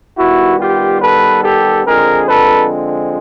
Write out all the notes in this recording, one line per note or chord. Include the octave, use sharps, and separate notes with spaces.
D#3 G3 B3 E4 F#4
F4 G4
A4 B4
G4 A4
D3 F3 G#3 C4 G#4 A#4
A4 B4